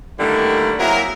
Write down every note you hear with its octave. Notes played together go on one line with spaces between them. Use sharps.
D3 D#3 G3 A3 A#3 E4
F#3 A#3 C4 E4 G#4 A#4